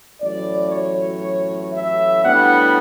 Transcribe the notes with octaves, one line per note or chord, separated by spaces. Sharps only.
A1 A2 F#3 D5
C#5
E5
A2 G3 B3 D4 F#5